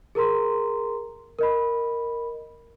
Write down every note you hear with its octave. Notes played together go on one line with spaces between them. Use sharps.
G#4 A#4 A#5 C6
A#4 D#5 B5